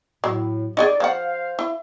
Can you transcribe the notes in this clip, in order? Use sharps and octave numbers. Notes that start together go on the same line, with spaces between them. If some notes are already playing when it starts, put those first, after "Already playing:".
A2 F#3
D#4 G4 G#4 D5
F3 C5 F5 F#5
E4